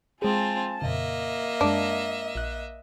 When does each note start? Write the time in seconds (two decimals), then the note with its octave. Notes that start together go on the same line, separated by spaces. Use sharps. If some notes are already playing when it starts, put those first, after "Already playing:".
0.22 G#3 C4 F4 G#4 G#5 A5
0.82 F2 A#2 C#3 A#3 D#5 E5
1.61 F#2 G#3 D4
2.35 A#1 F#6